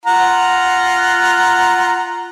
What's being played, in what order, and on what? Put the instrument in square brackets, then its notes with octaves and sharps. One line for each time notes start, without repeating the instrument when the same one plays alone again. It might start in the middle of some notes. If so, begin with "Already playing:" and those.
[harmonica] F4 F#5 A#5